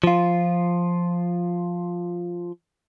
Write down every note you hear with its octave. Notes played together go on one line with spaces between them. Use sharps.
F3 F4